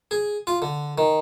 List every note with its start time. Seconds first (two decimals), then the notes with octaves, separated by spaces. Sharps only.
0.11 G#4
0.47 F4
0.62 D3
0.98 D#3